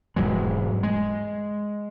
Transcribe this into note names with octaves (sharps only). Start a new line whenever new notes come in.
E1 G#2 F#3 G#3
G#3